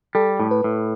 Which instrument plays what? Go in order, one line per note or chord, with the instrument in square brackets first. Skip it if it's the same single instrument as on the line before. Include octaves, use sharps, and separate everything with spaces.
[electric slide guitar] G3 [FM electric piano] A4
[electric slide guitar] A2
[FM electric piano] B4
[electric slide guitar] A2